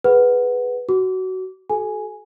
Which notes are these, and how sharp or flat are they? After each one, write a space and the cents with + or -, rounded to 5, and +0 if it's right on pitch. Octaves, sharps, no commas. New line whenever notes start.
G#4 +0 B4 +0 F#5 +0
F#4 +15 D6 -30
F#4 +25 A4 -35 G#5 +0